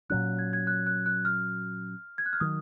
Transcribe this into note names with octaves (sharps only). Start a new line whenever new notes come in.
A#2 F#3 C#4 F#6
G#6
G#6
F#6
F#6
F#6
F6
G#6
F#6
F6
D#3 F#3 D#6